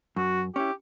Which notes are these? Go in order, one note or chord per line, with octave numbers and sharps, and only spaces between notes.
F#2 F#4
C#4 E4 G4